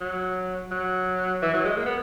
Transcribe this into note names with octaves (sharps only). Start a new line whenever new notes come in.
F#3
F#3
E3
F#3
G#3
A#3
B3